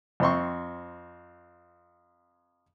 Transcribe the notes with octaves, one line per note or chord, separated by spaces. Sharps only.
F2 C4 C6 C#6